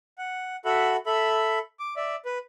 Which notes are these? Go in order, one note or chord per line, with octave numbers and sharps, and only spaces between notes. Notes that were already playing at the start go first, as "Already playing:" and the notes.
F#5
F#4 A4 E5 F#5 B5
A4 E5 B5
D6
D5 E5
B4